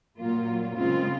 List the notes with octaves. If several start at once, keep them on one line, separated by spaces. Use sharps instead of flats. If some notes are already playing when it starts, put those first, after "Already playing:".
A#2 F#3 A#3 F4
C#3 G#3 C4 F4